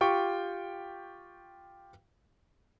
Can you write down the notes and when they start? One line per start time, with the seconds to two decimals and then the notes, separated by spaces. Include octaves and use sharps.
0.01 F4 G4 G5 C#6